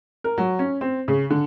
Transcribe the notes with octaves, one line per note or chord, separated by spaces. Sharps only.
A#4
F#3
C#4
C4
C#3
D3